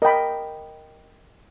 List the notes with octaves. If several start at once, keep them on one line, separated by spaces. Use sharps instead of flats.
A#4 D#5 G5 B5